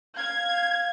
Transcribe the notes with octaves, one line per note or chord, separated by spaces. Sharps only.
F5 G#6